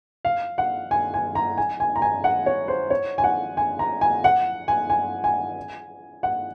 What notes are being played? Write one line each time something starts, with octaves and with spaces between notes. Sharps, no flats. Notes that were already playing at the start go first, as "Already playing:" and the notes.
F5
F#5
G#5
G#5
A#5
G#5
G#5
A#5
G#5
F#5
C#5
C5
C#5
G#5
F#5
G#5
A#5
G#5
F#5
G#5
G#5
G#5
F#5